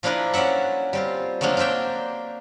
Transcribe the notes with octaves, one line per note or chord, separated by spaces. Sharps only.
F3 A#3 D4 E4 A#4 B4
F#3 C#4 D5 E5 F#5
G3 C4 F4
F3 F#3 A3 A#3 D4
D4 A#4 C5 E5 G5